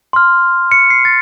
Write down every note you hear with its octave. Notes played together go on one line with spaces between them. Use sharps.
C6 F6
C#7
C7
A6